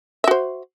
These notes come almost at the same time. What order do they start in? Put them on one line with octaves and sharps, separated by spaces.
E5 F#4 C5